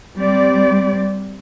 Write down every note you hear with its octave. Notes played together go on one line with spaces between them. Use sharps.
G3 C4 D5